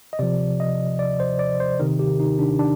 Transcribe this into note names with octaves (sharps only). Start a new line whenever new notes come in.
D#5
C3 F3 D5
D#5
D5
C5
D5
C5
C3 D#3 A#4
G4
D#4
D4
D4